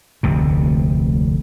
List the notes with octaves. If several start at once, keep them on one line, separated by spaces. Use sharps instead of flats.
F1 D2 C3